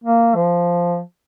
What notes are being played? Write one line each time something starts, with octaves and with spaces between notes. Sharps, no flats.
A#3
F3